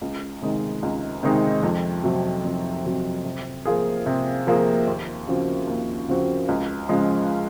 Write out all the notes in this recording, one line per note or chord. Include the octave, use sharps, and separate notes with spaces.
C#2
C3 D#3 G#3 D#4
C#2
C3 D#3 G#3 D#4
F2
C3 F#3
F2
C3 F#3
C3
F3 A#3 F4 G#4
C3
F3 A#3 F4 G#4
D#2
C#3 F3 C4 F#4
D#2
C#3 F3 C4 F#4
C#2
C#3 F3 G#3